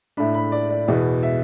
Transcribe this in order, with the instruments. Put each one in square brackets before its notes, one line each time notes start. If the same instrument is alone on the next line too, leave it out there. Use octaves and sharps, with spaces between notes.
[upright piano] A2 A3 D4 B5
B5
D5
D5
E2 B2 B3 E4 E5
E5